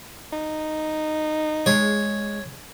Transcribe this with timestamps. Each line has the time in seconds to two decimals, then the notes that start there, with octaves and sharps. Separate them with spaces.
0.33 D#4
1.66 G#3 C#5